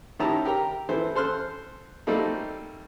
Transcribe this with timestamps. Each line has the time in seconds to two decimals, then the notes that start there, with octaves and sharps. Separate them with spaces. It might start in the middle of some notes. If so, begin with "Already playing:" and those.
0.19 D#3 C#4 E4 G4 A5 A#5
0.45 G4 A#4 G5 A#5
0.89 E3 E4 A4 C5
1.15 A4 C5 C6 F6 F#6
2.07 G3 A3 A#3 C4 D#4 A4